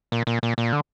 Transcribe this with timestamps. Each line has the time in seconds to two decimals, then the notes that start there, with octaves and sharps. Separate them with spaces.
0.12 A#2
0.27 A#2
0.43 A#2
0.58 A#2
0.73 D3